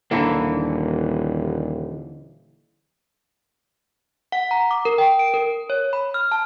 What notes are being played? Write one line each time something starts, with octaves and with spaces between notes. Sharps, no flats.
D#1 D3 E3 A#3
F#5
A#5
D6
A#4
G5
D7
A#4
C#5
B5
F6
A5